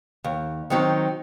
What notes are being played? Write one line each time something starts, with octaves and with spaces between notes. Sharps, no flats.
D#2
D#3 F#3 C4 D#4